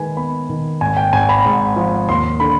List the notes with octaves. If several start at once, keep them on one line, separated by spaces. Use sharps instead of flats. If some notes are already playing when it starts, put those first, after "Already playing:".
Already playing: D#3 G#3 B4 G#5
B3 B5
D#3
G#1 G#5
G5
G#1 G#5
B5
G#2
F3
D#2 C6
D3 B5